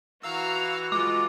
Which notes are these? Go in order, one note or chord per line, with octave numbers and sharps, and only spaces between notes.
E3 F#4 F5 A#5 E6 F6
G#3 F4 D6